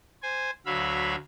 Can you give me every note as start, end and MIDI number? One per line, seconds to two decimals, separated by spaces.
0.23 0.51 72
0.23 0.51 80
0.66 1.15 38
0.66 1.15 54
0.66 1.15 76
0.66 1.15 77
0.66 1.15 83